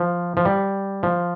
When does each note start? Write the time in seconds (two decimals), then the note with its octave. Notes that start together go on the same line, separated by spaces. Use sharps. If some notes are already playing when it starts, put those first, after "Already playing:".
Already playing: F3
0.37 F3
0.45 G3
1.03 F3